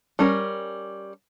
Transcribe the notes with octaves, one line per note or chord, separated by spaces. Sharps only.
G3 C#4 A#4